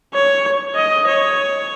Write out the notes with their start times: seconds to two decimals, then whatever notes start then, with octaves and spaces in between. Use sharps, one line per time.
0.14 C#5
0.76 D#5
1.07 C#5